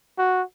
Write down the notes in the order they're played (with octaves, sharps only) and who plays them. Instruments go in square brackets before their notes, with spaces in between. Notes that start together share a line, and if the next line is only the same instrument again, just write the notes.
[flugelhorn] F#4